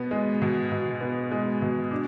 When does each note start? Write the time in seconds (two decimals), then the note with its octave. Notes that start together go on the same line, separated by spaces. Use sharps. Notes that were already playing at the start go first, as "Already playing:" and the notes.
Already playing: B2 B3
0.11 G#3
0.42 B2
0.72 B2
1.01 B3
1.32 G#3
1.62 B2
1.91 D4